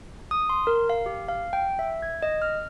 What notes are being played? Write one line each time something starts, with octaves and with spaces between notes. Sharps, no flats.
D#6
C6
A#4
F5
G4
F5
G5
E5
G#6
D#5
F6